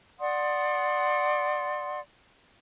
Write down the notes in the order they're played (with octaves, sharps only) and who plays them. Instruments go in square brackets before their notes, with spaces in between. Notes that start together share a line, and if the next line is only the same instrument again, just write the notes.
[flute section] D5 F#5 C6 D#6